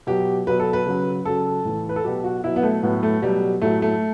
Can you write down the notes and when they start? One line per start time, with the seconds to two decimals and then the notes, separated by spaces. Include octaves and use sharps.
0.07 B2 F#3 G4
0.47 B2 F#3 B4
0.60 A4
0.73 B4
0.86 C#3 F#3
1.25 C#3 F#3 A4
1.65 A2 E3
1.89 B4
1.96 A4
2.04 B2 F#3 G4
2.24 F#4
2.44 B2 F#3 E4
2.56 B3
2.63 A3
2.83 A2 F#3 B3
3.03 A3
3.22 B2 F#3 G3
3.62 A2 F#3 A3
3.82 A3